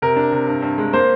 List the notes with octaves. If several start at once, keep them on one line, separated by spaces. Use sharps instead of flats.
C3 A#4
D4
C3
G2
G2
G#3
A#3 C5